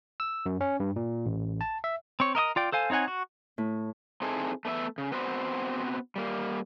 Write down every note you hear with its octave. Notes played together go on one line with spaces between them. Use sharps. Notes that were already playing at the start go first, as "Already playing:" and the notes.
E6
F#2
C#4
G2
A#2
A1
A5
E5
C4 C#5
A#4 D#5 E5 D#6
F4 D5 G5
A4 C5 F5 G#5
C4 D#4 C#5 F#5 G#5
F#4
A2
C4 D#4 E4 G#4 A4
A3 B3 D5 E5
C#3
B3 C4 F#4 B4 C5
G3 A#3